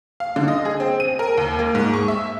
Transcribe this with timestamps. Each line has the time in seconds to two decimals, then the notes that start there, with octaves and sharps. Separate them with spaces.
0.20 F5
0.36 D3
0.48 D#5
0.65 G#4
0.80 C4
1.00 D#7
1.19 A#4
1.38 D#2
1.59 A#3
1.75 G#2
1.94 C#6
2.08 E5